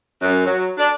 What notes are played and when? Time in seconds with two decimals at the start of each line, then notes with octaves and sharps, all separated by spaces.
0.22 F#2
0.46 F#3
0.78 D4